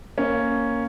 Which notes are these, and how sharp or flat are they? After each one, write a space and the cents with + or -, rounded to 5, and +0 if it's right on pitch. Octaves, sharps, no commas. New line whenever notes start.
A#3 +0 C#4 +0